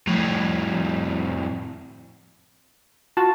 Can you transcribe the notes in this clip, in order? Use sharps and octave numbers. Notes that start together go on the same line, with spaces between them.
F2 A2
F4 F#4 A5